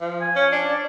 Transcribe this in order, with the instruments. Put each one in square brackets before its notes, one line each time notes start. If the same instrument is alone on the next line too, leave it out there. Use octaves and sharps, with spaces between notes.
[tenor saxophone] F3
[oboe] G#5
[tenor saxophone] C#4
D4
[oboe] D5